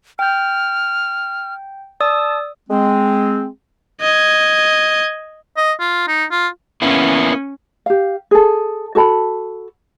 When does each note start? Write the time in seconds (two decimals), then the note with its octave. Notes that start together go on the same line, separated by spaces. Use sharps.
0.19 G5 F6 G6
2.00 D5 A5 D#6 E6
2.70 G#3 C4
4.01 D#5 G#6
5.57 D#5
5.80 F4
6.07 D#4
6.31 F4
6.82 A#3 B3 C#4 E4
7.86 G4 F5
8.31 G#4 A4
8.95 F#4 A4 A5 B5